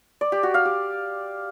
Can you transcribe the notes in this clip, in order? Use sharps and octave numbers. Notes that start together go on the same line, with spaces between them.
D5
G4
F#4
F5
G4